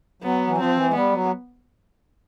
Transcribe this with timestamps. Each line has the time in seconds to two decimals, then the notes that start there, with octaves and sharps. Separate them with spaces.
0.22 F#3 B3
0.47 E3
0.58 F3 C4
0.76 E3
0.89 G#3
0.94 G3 B3
1.13 F#3